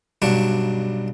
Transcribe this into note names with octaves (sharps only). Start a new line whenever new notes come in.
B1 G2 F#3 D4